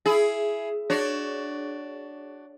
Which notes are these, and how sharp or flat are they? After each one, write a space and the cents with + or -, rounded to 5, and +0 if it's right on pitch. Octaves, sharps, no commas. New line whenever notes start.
E4 +15 G#4 +15
D4 +0 F#4 +20 C#5 +10